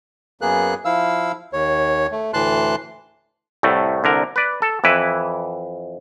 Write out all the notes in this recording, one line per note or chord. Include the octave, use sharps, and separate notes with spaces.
F#2 A#3 B3 G#4 F#6
F3 E4 F5 E6
D#2 C#5
A3
D2 A2 E3 A5 C6 F#6
C2 A2 A3
C2 D3 A#4
B4 D5
A4
F2 E3 E4 B4